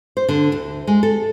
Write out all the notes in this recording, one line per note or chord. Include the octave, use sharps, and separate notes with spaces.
C5
D3
D2
G#3
A4